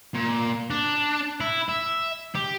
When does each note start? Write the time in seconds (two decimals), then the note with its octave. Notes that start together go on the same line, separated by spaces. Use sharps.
0.14 A#2
0.70 D4
1.41 E4
1.69 E5
2.35 G4